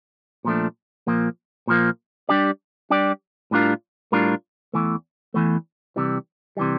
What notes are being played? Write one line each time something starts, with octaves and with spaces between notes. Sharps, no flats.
A#2 F3 A3 D4
A#2 F3 A#3
A#2 F3 A#3
G3 D4 G4 D5
G3 D4 G4 D5
A2 G3 D4 F4 A#4
A2 G3 D4 F4 A#4
E2 E3 A3
E2 E3 A3
C3 E3 G3
C3 E3 G3